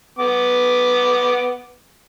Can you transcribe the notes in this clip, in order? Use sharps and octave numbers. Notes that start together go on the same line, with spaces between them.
B3 D6